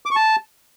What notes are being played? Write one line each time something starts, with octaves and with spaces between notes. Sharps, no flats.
D6
C#6
A5